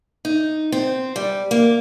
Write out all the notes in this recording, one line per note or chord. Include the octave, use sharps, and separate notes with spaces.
D#4
C4
G3
A#3